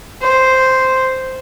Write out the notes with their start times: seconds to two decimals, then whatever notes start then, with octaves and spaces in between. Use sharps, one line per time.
0.22 C5